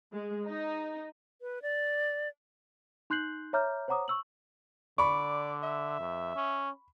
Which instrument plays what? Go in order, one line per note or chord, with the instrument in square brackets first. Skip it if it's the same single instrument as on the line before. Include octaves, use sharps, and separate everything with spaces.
[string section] G#3
D#4
[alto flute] B4
D5
[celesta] D#4 C6 F#6 G6 C7 F#7
C#5 E5 A#5 D6 F6 G6
C5 C#5 F#5 A#5 D6 D#6
C#6 E6 F#7
[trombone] D3 [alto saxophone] D5 [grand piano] B5 C#6
[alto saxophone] E5
[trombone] F2
C#4